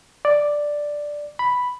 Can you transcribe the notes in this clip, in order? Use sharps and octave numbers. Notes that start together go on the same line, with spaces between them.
D5
B5